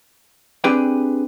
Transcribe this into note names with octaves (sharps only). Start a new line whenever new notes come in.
C4 D4 G4 G#4 B4 G5